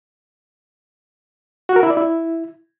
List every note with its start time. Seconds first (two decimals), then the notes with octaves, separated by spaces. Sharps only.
1.69 F#4
1.76 A#4
1.83 E4
1.90 D5
1.97 E4